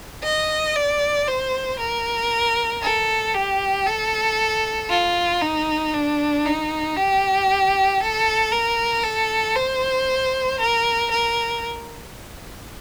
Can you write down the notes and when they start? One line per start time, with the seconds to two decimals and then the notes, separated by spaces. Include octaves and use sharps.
0.24 D#5
0.76 D5
1.28 C5
1.79 A#4
2.82 A4
3.34 G4
3.86 A4
4.90 F4
5.41 D#4
5.93 D4
6.45 D#4
6.97 G4
8.00 A4
8.52 A#4
9.03 A4
9.55 C5
10.60 A#4
11.11 A#4